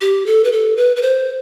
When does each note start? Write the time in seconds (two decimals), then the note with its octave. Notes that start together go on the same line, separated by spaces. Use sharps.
0.01 G4
0.26 A4
0.44 B4
0.52 A4
0.77 B4
0.96 B4
1.02 C5